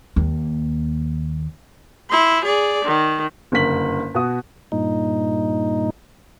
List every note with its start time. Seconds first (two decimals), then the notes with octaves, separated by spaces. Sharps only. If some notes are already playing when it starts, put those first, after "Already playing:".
0.16 D#2 A#3
2.10 E4 C6
2.44 G#4 D5
2.85 D#3
3.52 F#1 G2 D3 A#4 B6 F#7
4.14 B2 F#4 D#6
4.72 G2 A#2 D#4